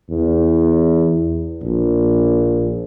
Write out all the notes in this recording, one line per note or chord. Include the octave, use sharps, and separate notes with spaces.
E2
A#1